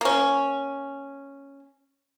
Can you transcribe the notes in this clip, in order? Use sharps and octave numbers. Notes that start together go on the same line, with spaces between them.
A#3 C#4